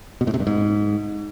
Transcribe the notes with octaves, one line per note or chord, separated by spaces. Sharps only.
B2
A2
C3
G2
G#2